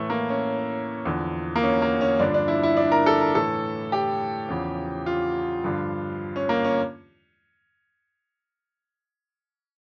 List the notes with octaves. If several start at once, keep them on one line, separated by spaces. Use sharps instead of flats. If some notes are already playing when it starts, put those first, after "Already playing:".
Already playing: A2 E3 A3
A#3
C#4
E2 D3 F3
A#3
C#4
A#3
C#4
G2 D3 F3 D4
D4
E4
E4
D4
A#4
A4
A#4
A2 E3 A4
G4
E2 C#3 F3
F4
G2 D3 F3
C#4
A#3
C#4